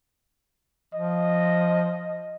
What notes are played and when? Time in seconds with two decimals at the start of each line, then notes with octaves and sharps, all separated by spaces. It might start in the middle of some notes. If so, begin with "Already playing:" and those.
0.94 F3 D#5